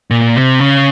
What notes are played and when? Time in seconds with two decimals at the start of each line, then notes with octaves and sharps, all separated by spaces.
0.11 A#2
0.36 C3
0.60 C#3